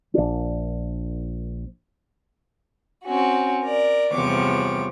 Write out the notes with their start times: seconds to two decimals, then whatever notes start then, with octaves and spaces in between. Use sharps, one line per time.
0.14 A#1 D4
3.04 C4 C#4 F#4
3.64 A#4 D5
4.14 E2 G2 C3 F3 C#5 D6